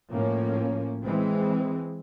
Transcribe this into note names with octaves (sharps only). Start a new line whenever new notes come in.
A2 F3 A#3 C#4
E3 G#3 C4